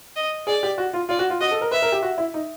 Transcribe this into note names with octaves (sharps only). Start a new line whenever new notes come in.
D#5
G#4 D5
G4
F#4
F4
F4 D5
F#4
F4
F#4 D#5
A4
A#4
B4 E5
A#4
G4
F#4
E4
D#4